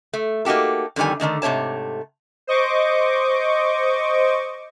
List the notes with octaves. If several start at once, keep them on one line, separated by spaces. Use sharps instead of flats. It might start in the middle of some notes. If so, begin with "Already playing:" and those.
A3
A#3 D#4 F#4 G4 A4
F2 D3 D#3 G3 G#5
D3 D#3 A3 D#4
G#2 C3 A3 C#5 A5
C5 D#5 C#6 D6